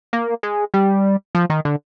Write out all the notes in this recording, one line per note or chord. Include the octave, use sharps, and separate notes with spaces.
A#3
G#3
G3
F3
D#3
D3